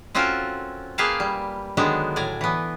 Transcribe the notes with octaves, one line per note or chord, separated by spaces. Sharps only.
C4 C#4 F4 F#4 A4 A#4
A#3 G#4 B4 F5 G5 A5
G3
D3 D#3 F#3 G#3 B3 D4
A2 D5 G#5 A#5
E3 B3